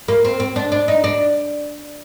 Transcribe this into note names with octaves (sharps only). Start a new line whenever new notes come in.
A#3
C4
C4
D4
D4
D#4
D4